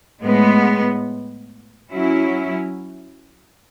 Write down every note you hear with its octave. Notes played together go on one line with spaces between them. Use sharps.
A2 G#3 B3
F#3 C#4 E4